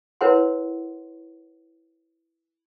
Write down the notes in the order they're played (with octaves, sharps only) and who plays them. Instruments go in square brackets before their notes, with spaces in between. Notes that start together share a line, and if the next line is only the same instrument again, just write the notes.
[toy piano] E4 A#4 B4 C#5 F#5 C6